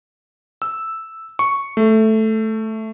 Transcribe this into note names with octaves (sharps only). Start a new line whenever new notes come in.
E6
C#6
A3